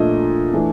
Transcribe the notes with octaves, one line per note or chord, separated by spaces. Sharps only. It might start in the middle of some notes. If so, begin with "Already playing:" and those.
Already playing: A#2 F3 A3 D4 D#5
E3 A3 D4